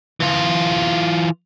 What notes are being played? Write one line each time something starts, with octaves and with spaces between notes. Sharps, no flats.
E3 F4